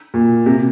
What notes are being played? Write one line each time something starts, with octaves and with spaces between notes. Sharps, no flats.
A#2
C3